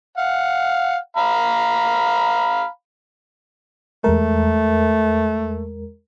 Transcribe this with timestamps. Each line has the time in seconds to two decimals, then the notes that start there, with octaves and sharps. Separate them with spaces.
0.18 F5 F#5
1.17 F5 A#5 B5
4.04 E2 G#3 A3 A#4